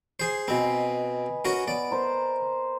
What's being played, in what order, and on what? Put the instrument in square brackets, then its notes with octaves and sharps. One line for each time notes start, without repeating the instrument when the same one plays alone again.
[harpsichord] G#4 C5
[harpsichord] B2 C4 [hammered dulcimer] B4 D#5 G#5
[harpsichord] C#4 F#4 A#4
[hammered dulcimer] B3 [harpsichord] D5
[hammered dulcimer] A#4 C5